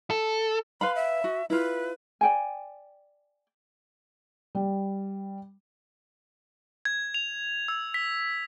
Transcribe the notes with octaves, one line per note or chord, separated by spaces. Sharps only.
A4
B4 F5 B5 C6
E5
F#4
E4 F4 B4
D5 G5 G#5
G3
G#6
F7
E6
B6